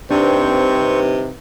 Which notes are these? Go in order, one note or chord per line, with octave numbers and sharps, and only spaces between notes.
G2 C3 C4 D4 D#4 B4 C#6 G6